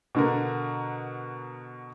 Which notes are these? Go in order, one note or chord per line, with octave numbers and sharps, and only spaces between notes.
B2 D3 A#4